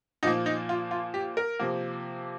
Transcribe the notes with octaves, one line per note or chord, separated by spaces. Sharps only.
A#2 F3 A#3 D#4
D#4
F4
F4
G4
A#4
C3 F3 A#3